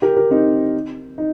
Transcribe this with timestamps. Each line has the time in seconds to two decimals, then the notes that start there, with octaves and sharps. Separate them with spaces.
0.02 G4 A#4
0.16 G4 A#4
0.31 C4 D#4
1.18 D#4